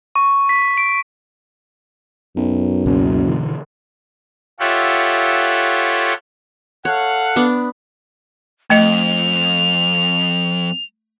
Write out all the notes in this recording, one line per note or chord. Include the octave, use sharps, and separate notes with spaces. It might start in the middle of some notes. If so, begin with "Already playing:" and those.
C#6
B6
D7
B1 F#2
F#1 C#2 B2
B2 D3 E3
F4 G4 A4 C#5 E5 F#5
A4 C#5 F5 F#5
B3 D4
F2 A3 D#5 F7